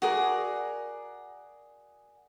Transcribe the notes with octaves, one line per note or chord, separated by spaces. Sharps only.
F#4 G#4 A#4 D5